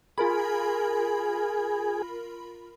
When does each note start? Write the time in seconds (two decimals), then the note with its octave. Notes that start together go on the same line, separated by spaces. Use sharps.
0.18 F4 G#4 A#4 B5